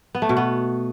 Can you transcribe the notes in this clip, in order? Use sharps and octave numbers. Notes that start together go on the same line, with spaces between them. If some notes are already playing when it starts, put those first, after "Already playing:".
B3
A3
B2
B3